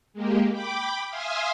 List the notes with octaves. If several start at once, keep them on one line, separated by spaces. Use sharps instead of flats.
G#3 A#3 G4
G5 B5 D6
E5 F5 G#5 C6 D#6 F6